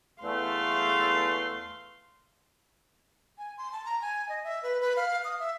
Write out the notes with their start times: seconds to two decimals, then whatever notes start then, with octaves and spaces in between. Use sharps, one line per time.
0.22 E2 A3 F5 C6
3.38 G#5
3.58 C6
3.72 A5
3.85 A#5
4.02 G#5
4.29 D#5
4.44 E5
4.63 B4
4.81 B4
4.96 F5
5.24 D#6
5.39 E5